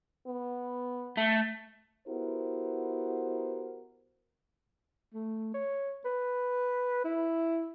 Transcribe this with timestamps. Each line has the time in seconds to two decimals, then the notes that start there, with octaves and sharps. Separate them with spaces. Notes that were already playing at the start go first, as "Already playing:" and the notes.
0.27 B3
1.18 A3
2.08 B3 E4 F#4 G4 A#4 C5
5.14 A3
5.54 C#5
6.05 B4
7.05 E4